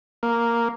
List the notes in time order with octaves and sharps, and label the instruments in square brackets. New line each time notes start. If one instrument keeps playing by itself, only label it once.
[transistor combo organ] A#3